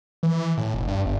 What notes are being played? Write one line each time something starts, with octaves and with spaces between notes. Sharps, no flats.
E3
A2
F1
G2
G1